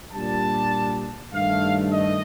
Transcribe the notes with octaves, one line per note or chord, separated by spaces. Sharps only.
A#2 G3 D4 A5
G2 D#3 A3 F5
D#5